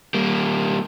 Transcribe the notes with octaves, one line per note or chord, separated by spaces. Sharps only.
G3 A#3